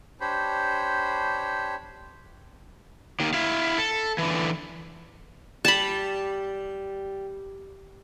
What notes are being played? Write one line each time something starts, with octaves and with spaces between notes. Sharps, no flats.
D4 G4 C5 C#5 B5
D#2 D#3
E4 F5
A4
D3 E3
G3 A5 B5